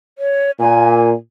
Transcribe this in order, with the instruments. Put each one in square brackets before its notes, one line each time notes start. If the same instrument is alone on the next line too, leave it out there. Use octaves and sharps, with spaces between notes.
[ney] C#5
[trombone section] A#2 [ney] G#5